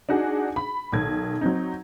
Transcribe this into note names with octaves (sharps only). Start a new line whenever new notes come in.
D4 D#4 F#4 G#4
B5
B1 D#3 G#6
F#3 C4 D#4